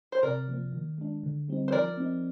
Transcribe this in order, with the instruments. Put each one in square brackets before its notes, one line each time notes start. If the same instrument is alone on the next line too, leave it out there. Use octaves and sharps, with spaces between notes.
[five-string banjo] C5
[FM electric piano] C3 [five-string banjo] A#4 D5
[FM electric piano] F3 A#3
D#3
G#3 D4
D3
G3 C4 D#4
[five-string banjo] C5
[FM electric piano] F3 [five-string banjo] A#4 D5
[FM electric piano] C4 D#4